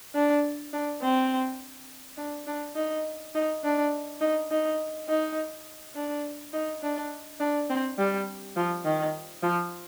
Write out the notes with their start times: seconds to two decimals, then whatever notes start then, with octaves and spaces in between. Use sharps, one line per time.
0.15 D4
0.73 D4
1.02 C4
2.18 D4
2.47 D4
2.76 D#4
3.35 D#4
3.64 D4
4.21 D#4
4.51 D#4
5.09 D#4
5.96 D4
6.53 D#4
6.83 D4
7.40 D4
7.70 C4
7.99 G3
8.57 F3
8.85 D#3
9.43 F3